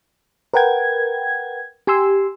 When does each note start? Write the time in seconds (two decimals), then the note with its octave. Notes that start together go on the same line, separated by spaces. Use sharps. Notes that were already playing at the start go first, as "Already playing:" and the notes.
0.54 A#4 B4 F#5 G5 G#6
1.87 G4 G#5 C6 E6